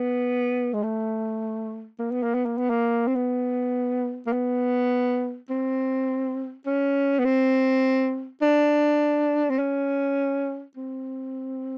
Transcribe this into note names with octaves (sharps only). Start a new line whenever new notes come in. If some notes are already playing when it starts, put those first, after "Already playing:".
Already playing: B3
G#3
A3
A#3
B3
A#3
B3
A#3
B3
A#3
C4
B3
A#3
B3
C4
C#4
B3
C4
D4
C4
C#4
C4